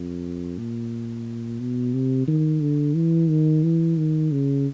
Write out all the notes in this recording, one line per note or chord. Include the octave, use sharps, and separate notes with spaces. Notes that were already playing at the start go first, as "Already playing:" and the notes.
Already playing: F2
A#2
B2
C3
D#3
D3
E3
D#3
E3
D#3
C#3